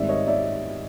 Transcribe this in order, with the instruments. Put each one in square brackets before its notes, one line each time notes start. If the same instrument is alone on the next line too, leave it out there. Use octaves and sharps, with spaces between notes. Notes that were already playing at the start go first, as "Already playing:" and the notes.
Already playing: [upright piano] G#2 D#3 G3 C4 D5 E5
C#5 D#5
D5 E5